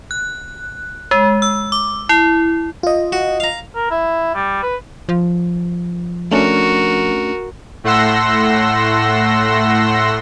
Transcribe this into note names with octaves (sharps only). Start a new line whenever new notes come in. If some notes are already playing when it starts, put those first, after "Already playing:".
F#6
G#3
E6
D6
E4
F4 D#5
F#4
F5 A#5
A#4
E4
G3
B4
F3
A3 C#4 D4 F#4 A#4
A2 A3 F#5 C6 E6 A#6